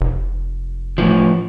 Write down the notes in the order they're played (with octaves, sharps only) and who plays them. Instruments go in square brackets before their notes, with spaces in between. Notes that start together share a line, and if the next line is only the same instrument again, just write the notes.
[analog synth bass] F1
[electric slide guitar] A2 E3 F3